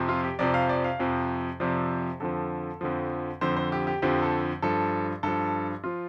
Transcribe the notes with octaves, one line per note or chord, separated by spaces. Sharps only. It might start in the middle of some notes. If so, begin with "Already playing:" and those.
Already playing: F2 C3 F3
F4
G4
F2 C3 F3 D5
F5
D5
F5
F2 C3 F3
F2 C3 F3 D5
F2 D3 F3 A4
F2 D3 F3
F2 D3 F3 C5
C5
G4
G4
F2 D3 F3 G4
A4
G2 F3 A4
G2 F3 A4
F3 F4